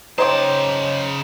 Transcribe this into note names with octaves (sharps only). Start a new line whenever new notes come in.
C#3 D#4 C5 C#5 G5 A5 C6 D6